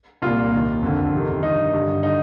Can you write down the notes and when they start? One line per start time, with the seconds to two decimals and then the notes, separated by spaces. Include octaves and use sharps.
0.22 C2 A#2 F4
0.52 D#2 D#3
0.82 F2 D3
1.13 F2 C3 D#3
1.43 G2 D#3 D#4
1.73 G2 D3
2.03 D3 D#4